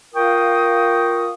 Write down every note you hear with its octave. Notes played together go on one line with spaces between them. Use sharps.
F4 A#4 F5 G5 C#6 D#6